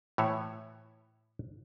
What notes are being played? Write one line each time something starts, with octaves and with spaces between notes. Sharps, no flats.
A2 E3 C#5 E5